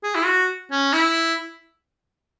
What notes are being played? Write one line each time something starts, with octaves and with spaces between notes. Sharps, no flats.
G#4
E4
F#4
C#4
E4